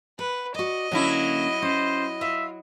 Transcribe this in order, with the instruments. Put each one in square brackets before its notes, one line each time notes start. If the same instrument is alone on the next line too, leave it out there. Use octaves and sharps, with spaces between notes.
[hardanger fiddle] B4 [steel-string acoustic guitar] F#5
[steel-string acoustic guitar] F#4 D5 [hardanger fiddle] D#5
[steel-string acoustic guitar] D3 A#3 C#4 [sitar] F#3 E4
[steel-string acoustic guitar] C#4 [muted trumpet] C5
[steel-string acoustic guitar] F4 F5 [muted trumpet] E5